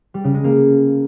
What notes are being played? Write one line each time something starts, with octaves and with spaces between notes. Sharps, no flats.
G3
C#3
G#3
A#3